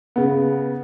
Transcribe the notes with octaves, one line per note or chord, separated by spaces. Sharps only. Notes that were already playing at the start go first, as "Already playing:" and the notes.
C#3 B3